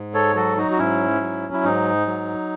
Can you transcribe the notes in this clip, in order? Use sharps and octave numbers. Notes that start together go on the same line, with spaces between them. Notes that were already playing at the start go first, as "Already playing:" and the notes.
Already playing: G#2
A4 C#5
F#3 F#4 A4
D#4 F#4
F#4
G#2 C#4 E4
F#3
E4
G#2 D#4
F#3